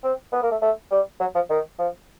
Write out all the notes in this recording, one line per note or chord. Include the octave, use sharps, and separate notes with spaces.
C4
B3
A#3
A3
A3
G3
F#3
F3
D#3
F3